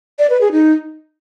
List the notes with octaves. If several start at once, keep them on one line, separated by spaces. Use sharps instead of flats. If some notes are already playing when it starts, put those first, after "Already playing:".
D5
B4
G#4
D#4